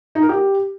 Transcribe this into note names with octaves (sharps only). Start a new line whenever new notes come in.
D#4
A#4
G4